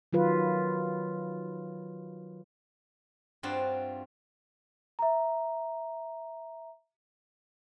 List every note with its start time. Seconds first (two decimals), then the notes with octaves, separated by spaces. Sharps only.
0.13 D#3 F#3 F4 B4
3.43 G2 C4 F4 F#4 D5 A5
4.99 E5 A#5